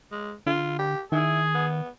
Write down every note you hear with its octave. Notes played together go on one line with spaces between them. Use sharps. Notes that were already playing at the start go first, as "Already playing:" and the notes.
G#3
D3 F4
G4
D#3 E4 G#4
B3